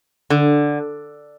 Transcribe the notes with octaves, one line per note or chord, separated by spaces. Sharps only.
D3